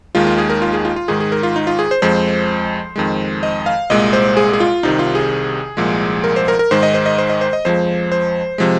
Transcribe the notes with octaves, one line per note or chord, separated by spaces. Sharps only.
D#2 D#3 G#3 F4
F4
G#4
A#4
F4
G#4
F4
F4
G#2 D#3 G#3 G#4
G#4
A#4
F4
D#4
F4
G#4
C5
F2 F3 G#3 C5
F2 D#3 G#3
D#5
F5
C2 A#2 G#3 D#5
C5
G#4
G#4
F4
C2 C3 D#3 D#4
F4
G#4
C2 A#2 F3 G#3
A#4
C5
A#4
A#4
G#2 D#3 G#3 C5
D#5
C5
D#5
C5
D#5
C5
D#5
F2 F3 G#3 C5
C5
C3 F3 G#3